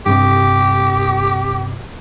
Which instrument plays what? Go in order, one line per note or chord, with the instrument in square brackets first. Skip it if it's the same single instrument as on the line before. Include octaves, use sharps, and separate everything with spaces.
[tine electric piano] G2 C3 [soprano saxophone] G4